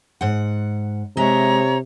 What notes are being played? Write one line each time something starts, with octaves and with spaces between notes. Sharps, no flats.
G#2 F#5
C3 G#3 C#5 D#5 E5 A#5